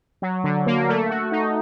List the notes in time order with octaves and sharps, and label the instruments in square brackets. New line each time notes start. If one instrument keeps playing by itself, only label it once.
[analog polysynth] F#3
D3
A#3
A3
F#4
D#4